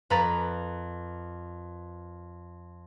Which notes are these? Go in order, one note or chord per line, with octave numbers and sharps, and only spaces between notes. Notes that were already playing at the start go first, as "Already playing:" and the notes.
F2 B4 A#5 A6